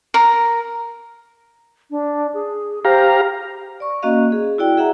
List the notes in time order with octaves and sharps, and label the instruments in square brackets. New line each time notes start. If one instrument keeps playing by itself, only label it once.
[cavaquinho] A#4
[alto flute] D4
G#4
[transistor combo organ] G4 F5 A#5 [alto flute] C5
[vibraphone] D5 C#6
A#3 C#4 F#4 D#5 F5
G#4
E4 F#4 D5 G5
G#4 E5 F#5 A#5